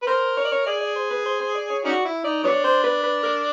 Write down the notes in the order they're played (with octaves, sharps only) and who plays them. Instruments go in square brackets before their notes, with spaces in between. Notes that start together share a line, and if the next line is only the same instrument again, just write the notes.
[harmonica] B4
[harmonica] A#4 [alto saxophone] C5
[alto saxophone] C#5
D5
C#5
[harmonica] G#4 [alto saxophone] D5
[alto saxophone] D5
C5
B4
C5
C5
D5
C#5
[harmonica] C#4 D#4 F#4 [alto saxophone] D5
[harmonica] E4
[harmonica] D#4 [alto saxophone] D5
[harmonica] F#3 B3 D4 [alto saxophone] C#5
[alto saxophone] C5
B4
B4
A#4